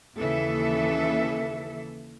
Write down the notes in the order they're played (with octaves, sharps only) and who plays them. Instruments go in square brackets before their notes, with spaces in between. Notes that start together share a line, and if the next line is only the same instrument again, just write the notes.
[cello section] D#2 C#3 E3 A4 E5